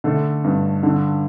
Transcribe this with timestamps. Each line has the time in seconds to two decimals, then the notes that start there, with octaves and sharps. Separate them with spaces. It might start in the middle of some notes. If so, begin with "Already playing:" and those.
0.04 D3 A3 A4
0.44 G2
0.83 D3